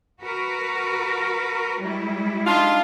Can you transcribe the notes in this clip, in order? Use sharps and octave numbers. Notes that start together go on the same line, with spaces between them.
F#4 A#4 B4
G3 G#3 E4
D4 D#4 F4